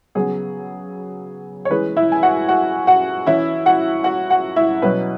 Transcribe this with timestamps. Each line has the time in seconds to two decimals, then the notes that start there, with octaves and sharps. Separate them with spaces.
0.15 C#3 F#3 B3 G#4
1.65 C#5
1.70 E3 G#3 C#4 B4
1.97 E4 E5
2.12 G#5
2.23 F#4 F#5
2.48 F#4 F#5
2.87 F#4 F#5
3.26 E3 C#4 E4 E5
3.66 F#4 F#5
4.04 F#4 F#5
4.30 F#4 F#5
4.56 E4 E5
4.82 B2 F#3 C#4 B4